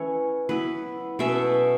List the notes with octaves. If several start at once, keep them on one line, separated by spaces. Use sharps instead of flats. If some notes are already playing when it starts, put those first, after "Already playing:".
Already playing: E3 A3 C#4 E4 C#5
F#3 B3 E4 B4
B2 F#3 A3 C#4 E5